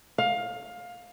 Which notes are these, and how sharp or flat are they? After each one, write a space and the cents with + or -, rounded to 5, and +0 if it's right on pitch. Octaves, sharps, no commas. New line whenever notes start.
F5 +20